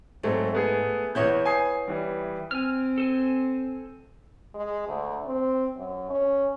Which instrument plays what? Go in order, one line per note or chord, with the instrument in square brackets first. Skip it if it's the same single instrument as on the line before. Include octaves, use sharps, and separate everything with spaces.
[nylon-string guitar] G#2 [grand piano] F#3 A3 C4
[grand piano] A3 B3 G#4
[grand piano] E2 G6 [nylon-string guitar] B3 E4 C#5
[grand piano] G#5 D#6 C7
E3 G3
[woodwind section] C4 [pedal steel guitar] G#5 F6
[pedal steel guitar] A4 C5 G#5
[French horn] G#3
D2
C4
F#2
C#4